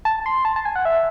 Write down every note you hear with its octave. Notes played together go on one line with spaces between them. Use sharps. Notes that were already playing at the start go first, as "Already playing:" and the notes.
A5
C6
A5
A5
G#5
F#5
E5